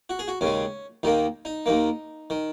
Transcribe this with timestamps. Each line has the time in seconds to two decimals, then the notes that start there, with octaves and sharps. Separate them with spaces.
0.10 F#4
0.19 G#4
0.28 F#4
0.41 D#2 C#3 G#3 C#4
1.03 D#2 D#3 A#3 D#4
1.45 D#4
1.66 D#2 D#3 A#3
2.30 D#3